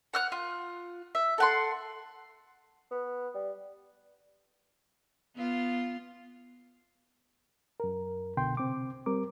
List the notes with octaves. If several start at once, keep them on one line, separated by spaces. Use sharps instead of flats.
F#5 F6 F#6
F4
E5
A4 F#5 C6
B3
G3
B3 F4
F#2 A#4
C2 B2 D3 G5 C6
C3 C4 D6
G3 C4 A#4 D6